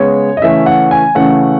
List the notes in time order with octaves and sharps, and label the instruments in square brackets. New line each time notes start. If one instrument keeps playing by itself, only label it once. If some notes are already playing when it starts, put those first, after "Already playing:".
Already playing: [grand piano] C#3 G#3 B3 C#5
D#5
C#3 E3 A3 C#4 E5
F#5
G#5
C#3 E3 A3 C#4 F#5